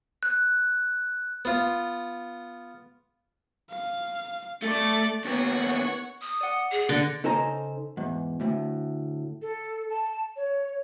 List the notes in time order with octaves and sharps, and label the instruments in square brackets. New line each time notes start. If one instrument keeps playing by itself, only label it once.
[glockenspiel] F#6
[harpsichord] B3 F4
[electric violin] F5
[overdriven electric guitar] A3 A4 [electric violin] D5 A6
[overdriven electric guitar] D#2 B3 [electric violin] C#5 F#5
[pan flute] D#6
[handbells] D5 F#5
[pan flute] G#4
[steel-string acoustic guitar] D3 [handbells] F#6 A6 A#6
[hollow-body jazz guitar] C#3 D#4 A4 C5 G#5 A#5
E2 G#2
D2 A2
[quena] A4
A5
C#5